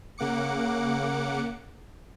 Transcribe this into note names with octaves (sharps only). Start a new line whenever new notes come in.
C#3 A#3 F#5 D6 C#7